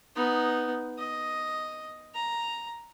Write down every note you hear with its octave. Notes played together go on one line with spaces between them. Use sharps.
B3 D#4
D#5
A#5